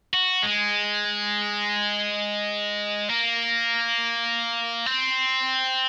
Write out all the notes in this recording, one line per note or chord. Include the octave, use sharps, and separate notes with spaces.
F#4
G#3
A#3
C4